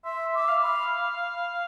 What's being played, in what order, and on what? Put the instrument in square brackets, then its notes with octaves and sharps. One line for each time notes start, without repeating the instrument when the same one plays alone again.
[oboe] E5 [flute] C6
[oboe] E5 [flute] D6
[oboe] F5
[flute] B5